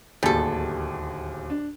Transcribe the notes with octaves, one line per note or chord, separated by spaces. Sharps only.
D1 D#2 G3 G#4 A4
D4